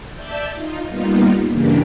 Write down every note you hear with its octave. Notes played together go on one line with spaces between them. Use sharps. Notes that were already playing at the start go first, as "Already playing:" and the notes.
D5 E5 A5 G6
D#4 F4
G3 A#3 B3 D#4 F4
G2 C#3 E3 A#3 D4 G4